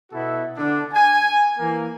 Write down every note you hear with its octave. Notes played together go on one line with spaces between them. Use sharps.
B2 B3 E4 F#4 A4
D3 D4
G#5
E3 A#3